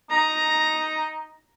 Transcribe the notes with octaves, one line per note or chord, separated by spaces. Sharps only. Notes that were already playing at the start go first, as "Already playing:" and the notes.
D#4 A#5